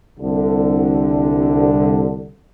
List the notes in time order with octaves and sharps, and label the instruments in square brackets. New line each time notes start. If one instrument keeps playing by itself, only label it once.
[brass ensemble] C2 D3